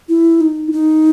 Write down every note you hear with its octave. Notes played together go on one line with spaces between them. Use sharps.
E4
D#4
E4
D#4